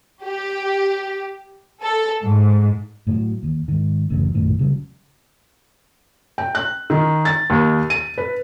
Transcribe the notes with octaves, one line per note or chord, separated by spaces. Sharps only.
G4
A4
G#2
A2 F3 F#3
D#2
G#2 D#3
D1 A1 F#2 C#3
A#1 F#2 A2 D#3
C#3 F#3 G3
G5
F#6
D#3
A6
D#2
D#7
B4